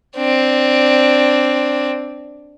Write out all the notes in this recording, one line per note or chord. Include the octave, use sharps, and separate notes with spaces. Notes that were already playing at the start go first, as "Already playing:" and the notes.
C4 D4